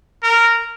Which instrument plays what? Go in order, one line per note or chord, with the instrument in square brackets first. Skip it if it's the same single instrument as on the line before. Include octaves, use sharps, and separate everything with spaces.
[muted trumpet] A#4